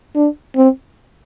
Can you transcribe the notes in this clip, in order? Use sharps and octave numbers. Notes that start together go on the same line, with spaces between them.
D4
C4